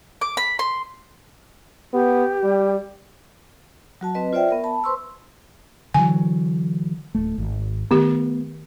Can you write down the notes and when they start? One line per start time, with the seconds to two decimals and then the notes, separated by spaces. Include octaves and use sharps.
0.21 D6
0.37 B5
0.59 C6
1.93 B3 G4
2.44 G3
4.01 F#3 F#4 A5
4.15 C4 B4 D#5
4.33 F4 C5 D5 E5 G5
4.49 B3 A#4 E5
4.64 A5 B5
4.84 B4 C5 C6 C#6 E6
5.94 D3 E3 F#3 G#5
7.15 D1 A3
7.38 G#1
7.91 D#3 A3 B3 G4